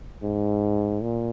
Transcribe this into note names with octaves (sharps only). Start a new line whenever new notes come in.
G#2
A#2